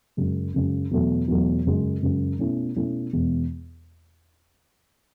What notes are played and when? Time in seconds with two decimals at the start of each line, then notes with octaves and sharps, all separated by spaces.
0.17 F#2 C#3 G#3
0.54 F#2 C#3 G#3
0.91 E2 B2 F#3 A3
1.28 E2 B2 F#3 A3
1.65 F#2 C#3 G#3
2.02 F#2 C#3 G#3
2.39 B2 A3 C#4 E4
2.76 B2 A3 C#4 E4
3.13 E2 B2 G#3